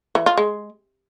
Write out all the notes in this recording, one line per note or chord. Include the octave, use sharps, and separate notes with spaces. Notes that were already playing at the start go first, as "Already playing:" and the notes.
E3
F4
G#3